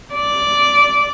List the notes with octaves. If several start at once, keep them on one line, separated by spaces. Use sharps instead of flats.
D5